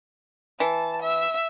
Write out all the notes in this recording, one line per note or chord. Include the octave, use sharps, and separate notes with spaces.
E3 A5
E5